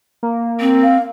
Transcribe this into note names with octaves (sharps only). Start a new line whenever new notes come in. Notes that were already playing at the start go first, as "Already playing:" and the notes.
A#3
C4
F5